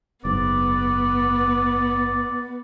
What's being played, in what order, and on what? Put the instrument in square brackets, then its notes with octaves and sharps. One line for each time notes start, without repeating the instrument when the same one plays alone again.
[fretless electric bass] F#1 G#2 [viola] B3 [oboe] D5